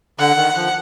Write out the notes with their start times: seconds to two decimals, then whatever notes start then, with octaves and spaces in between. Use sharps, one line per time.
0.19 D3 F#5
0.37 D#3
0.56 F3